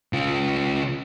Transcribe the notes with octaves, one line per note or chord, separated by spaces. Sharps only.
C#3 F4